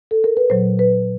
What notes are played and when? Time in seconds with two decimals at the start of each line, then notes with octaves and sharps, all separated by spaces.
0.11 A4
0.24 A#4
0.37 B4
0.50 A#2 F#3 C5
0.79 B4